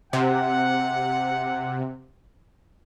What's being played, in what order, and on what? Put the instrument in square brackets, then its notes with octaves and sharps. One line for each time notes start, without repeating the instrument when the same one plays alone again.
[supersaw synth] C3 [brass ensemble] F#5